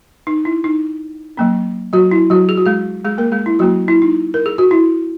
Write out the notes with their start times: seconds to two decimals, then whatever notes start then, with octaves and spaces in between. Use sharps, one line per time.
0.27 D#4
0.45 E4
0.64 D#4
1.37 F#3 A#3 C#4
1.93 F#3 F#4
2.11 E4
2.30 F#3 F#4
2.49 G#4
2.57 F#4
2.66 G#3 G#4
3.05 G#3 G#4
3.18 A#3 A#4
3.32 G#3 G#4
3.46 E4
3.59 F#3 A#3 C#4 F#4
3.88 E4
4.02 D#4
4.34 A#4
4.46 G#4
4.58 F#4
4.71 E4